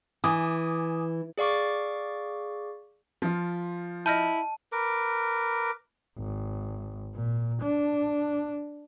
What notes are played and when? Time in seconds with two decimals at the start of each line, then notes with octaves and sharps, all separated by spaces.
0.24 E3 G#5 D6 D#6
1.38 G#4 D5 F5 C#6 D6
3.22 F3 F4
4.06 E4 D#5 A5 F6 G6
4.72 A#4 B4 D6
6.18 G#1
7.15 A#2
7.63 D4